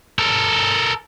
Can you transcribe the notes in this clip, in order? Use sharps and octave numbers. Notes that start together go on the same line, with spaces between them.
A4 A#4